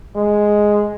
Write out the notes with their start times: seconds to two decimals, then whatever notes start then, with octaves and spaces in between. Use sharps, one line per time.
0.16 G#3